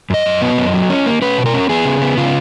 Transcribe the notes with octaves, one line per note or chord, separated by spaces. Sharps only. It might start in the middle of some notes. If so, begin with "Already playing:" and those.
F#2 D#5
F#2
B3
F#2
F#3
C#4
A#3
C#4 B4
B2
A#4
C#4
B3 G#4
C#3
B3
C#3 F4